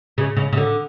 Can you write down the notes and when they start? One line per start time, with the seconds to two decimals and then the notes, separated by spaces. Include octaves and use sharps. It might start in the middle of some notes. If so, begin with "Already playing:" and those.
0.18 C#3
0.37 C#3
0.53 C#3
0.57 D3